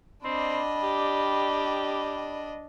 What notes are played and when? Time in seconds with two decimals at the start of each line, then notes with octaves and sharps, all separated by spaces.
0.24 G3 C4 D4 D#5 B5
0.83 G4